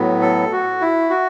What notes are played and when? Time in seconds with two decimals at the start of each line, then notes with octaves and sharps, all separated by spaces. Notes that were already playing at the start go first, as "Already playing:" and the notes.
Already playing: A2 F#3 B3
0.22 A4
0.52 F#4
0.81 E4
1.10 F#4